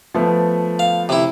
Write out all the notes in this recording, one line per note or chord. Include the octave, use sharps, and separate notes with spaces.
F3 A3 B3
F5
C3 E4